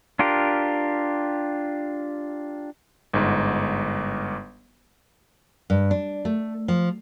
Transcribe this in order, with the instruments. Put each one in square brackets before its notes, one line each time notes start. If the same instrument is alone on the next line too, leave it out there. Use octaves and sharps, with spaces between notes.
[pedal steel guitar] D4 F4 G4 A#4
[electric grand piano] G1 G#2
[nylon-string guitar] G2
D4
A3
F3